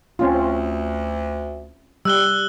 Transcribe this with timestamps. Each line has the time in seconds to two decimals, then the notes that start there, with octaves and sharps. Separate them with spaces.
0.19 D2 C4 C#4 F4
2.05 G3 E6 F#6 G7